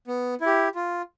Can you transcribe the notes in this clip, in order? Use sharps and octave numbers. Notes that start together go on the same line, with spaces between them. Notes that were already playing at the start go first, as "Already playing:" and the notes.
B3
E4
G4
F4